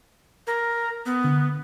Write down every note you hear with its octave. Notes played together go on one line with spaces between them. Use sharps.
A#4
B3
D3